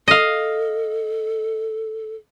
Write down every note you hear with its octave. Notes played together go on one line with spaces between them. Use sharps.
A4 D#5 F5